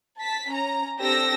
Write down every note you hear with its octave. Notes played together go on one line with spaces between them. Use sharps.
A5 B6
C#4 A#5
C4 D4 G4 A4 E6 A#6